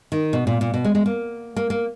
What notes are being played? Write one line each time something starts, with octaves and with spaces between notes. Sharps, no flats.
D#3
B2
A#2
A#2
B2
G#3
G#3
A#3
A#3
A#3